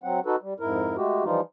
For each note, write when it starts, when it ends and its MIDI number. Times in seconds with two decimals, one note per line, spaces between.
0.04 0.20 54
0.04 0.20 60
0.04 0.20 78
0.26 0.36 63
0.26 0.36 66
0.26 0.36 69
0.26 0.36 71
0.42 0.54 55
0.60 0.96 41
0.60 0.96 44
0.60 0.96 64
0.60 0.96 70
0.97 1.24 56
0.97 1.24 57
0.97 1.24 66
0.97 1.24 67
1.24 1.41 52
1.24 1.41 53
1.24 1.41 55
1.24 1.41 63
1.24 1.41 65